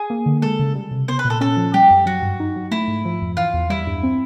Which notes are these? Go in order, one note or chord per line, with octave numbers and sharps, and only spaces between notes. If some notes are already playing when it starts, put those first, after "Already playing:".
Already playing: G#4
A#3
D3
G#3 A4
C#3
G3
C3
B3 C5
B4
A#2
A4
C#4 A4
F3
G3 G4
F#2
F#3 F#4
G2
D#4
F#3
A3 E4
G#2
F3
F2
E3 F4
E2
G3 E4
G2
C4